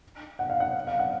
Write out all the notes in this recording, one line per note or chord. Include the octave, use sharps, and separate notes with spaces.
F#5
F5
F#5
F5
F#5